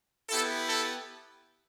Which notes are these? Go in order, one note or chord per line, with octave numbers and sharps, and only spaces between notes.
B3 E4 G4 A4
A4